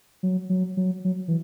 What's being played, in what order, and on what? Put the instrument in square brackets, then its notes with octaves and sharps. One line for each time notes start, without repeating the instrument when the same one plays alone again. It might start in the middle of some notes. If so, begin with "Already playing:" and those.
[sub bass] F#3
F#3
F#3
F#3
E3